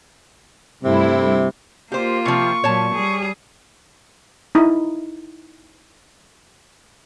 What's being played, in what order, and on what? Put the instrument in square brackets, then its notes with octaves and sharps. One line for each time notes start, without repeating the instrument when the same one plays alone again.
[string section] G2 A3 E4 [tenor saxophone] C3
[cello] A#3 F4 [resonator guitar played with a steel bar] G4 C5
[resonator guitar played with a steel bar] C3 F3 [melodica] C#6
[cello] A#2 F#3 [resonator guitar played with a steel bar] C#5 A5
[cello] G3 G#4
[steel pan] D#4 E4